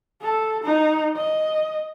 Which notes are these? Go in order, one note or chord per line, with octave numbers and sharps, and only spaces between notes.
A4
D#4
D#5